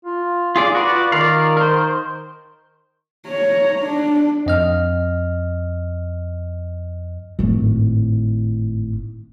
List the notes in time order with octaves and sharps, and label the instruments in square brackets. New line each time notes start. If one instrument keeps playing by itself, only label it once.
[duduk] F4
[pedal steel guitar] F4 G#4 D5
F#4 B4 D5
[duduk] F4
[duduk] D#3 [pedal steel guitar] A#4 D5 F5
[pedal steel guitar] A#4 C5
[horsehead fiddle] C#5 A#5
D4
[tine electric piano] F2 D#5 F6
[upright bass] G#1 A2